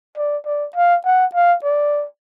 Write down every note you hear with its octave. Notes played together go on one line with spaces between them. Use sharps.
D5
D5
F5
F#5
F5
D5